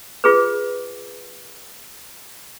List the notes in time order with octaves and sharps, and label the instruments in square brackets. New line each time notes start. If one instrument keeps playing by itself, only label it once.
[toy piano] F4 G#4 B4